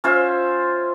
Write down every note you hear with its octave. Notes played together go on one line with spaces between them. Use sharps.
C#4 F4 C5 E5